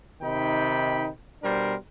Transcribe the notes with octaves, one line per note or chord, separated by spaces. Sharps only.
C3 D#3 D#4 G5 B5
B2 G3 D4 A#4 C5